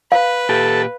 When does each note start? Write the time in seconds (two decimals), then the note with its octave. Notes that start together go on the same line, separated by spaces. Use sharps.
0.12 B4 F5
0.49 A#2 G4 A4